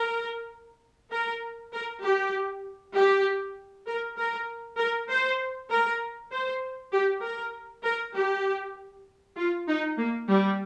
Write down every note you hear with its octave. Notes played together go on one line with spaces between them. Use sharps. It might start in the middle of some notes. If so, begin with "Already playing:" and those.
Already playing: A#4
A#4
A#4
G4
G4
A#4
A#4
A#4
C5
A#4
C5
G4
A#4
A#4
G4
F4
D#4
A#3
G3